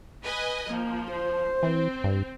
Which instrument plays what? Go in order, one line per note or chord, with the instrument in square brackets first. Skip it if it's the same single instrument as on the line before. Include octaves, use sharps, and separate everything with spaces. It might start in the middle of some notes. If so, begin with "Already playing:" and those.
[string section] B4 D#5 G#5
[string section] F3 [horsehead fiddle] A#3
[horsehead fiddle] C5
[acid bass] E3 [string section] C4
[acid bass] G2